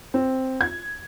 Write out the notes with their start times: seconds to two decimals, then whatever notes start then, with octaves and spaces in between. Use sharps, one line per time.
0.14 C4
0.61 G#6